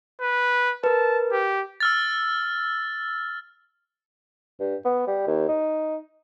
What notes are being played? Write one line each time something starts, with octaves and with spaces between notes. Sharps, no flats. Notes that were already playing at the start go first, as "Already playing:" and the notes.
B4
A#4 B4 A5
G4
E6 F6 A6
G2
B3
G3
D#2
D#4